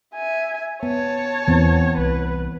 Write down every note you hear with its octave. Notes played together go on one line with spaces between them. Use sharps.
E5 G#5
B3 C#5 A5
E2 E3 B3 C4
C2 B4